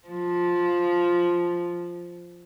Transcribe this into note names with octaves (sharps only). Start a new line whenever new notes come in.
F3